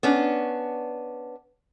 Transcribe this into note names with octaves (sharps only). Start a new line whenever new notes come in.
B3 C#4 D4